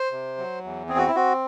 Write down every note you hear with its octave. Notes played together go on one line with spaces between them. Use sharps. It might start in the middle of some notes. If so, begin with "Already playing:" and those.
Already playing: C5
C3
F#3
E2
C4 G#4
F#4
E4
C4 F#4